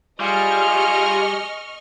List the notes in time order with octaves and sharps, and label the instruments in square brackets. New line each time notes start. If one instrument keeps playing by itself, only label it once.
[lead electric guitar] G3 [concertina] F4 [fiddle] G#4 [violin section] D#5 C#6 F6